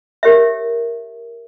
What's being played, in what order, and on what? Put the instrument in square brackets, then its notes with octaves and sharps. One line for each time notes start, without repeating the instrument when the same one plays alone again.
[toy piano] G4 A#4 C#5 E5